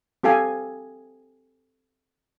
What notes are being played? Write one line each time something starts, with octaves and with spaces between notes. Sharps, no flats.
C4 G4 A4 F5 G#5